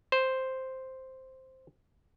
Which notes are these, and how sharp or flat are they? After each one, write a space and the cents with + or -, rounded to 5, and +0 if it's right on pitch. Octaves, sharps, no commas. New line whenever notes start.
C5 +0